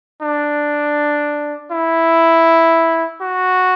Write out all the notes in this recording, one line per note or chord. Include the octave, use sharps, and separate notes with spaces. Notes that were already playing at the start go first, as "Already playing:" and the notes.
D4
E4
F#4